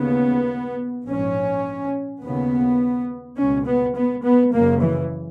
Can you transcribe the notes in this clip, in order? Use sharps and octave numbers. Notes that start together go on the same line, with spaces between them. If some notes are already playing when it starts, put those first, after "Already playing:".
Already playing: D#2 C#3 B3
A#1 G#2 C#4
D#2 C#3 B3
C#2 B2 C#4
B3
B3
B3
F#1 F#2 C#3 A#3
E3